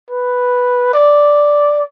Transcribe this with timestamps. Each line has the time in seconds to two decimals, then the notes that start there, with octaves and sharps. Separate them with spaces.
0.10 B4
0.94 D5